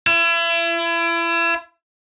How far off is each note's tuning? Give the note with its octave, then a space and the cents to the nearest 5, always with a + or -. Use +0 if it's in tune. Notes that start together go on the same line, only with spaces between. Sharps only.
E4 +35